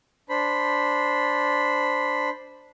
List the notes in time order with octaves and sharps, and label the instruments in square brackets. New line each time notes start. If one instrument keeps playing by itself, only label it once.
[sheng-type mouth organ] D4 C5 B5